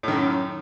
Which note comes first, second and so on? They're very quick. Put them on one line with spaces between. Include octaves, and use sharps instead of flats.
A2 D#3 F#2